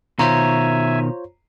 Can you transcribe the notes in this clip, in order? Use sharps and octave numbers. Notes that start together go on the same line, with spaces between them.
B2 D#3 F4 C5 C#5 E5 G#5 A#5